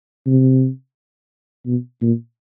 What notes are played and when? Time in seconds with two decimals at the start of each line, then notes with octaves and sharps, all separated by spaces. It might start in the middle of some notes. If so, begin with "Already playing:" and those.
0.26 C3
1.66 B2
2.02 A#2